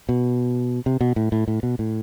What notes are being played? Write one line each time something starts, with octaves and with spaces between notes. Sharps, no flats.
B2
C3
B2
A2
A2
A2
B2
A2